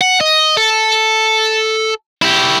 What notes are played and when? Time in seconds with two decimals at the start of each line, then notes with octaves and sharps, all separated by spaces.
0.01 F#5
0.21 D#5
0.57 A4
2.22 E4 G4